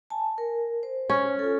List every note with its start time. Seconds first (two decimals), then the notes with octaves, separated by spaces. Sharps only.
0.10 G#5 A5
0.38 A#4
0.83 C5
1.10 C#4
1.39 F4 A4